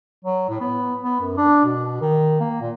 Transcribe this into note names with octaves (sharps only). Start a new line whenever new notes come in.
F#3
A2
B3
B3
F#2
D4
B2
D#3
A#3
A#2